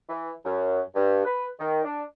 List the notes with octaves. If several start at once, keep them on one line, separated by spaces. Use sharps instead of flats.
E3
F#2
G2
B4
D#3
D4